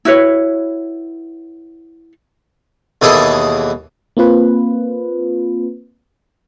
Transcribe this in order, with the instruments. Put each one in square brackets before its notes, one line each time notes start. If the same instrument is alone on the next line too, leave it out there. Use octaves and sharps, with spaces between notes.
[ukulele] E4 F#4 B4 C#5
[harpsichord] D#2 B2 E3 G#4 A4 A5
[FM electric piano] A#3 C4 F4 B4